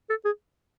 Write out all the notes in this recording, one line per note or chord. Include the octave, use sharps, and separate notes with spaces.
A4
G#4